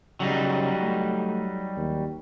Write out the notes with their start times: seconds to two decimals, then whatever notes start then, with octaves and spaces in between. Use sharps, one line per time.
0.20 C#3 F#3 G3 D#4
0.82 A3
1.77 D#2